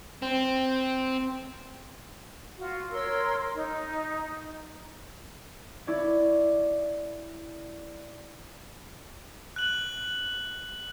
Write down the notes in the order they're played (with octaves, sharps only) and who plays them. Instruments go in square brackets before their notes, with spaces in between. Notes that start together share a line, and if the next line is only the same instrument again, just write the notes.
[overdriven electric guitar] C4
[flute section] F4 F#4
A#4 C#5 C6 E6
D#4
[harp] E4 C#5 D5
[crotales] F#6 F#7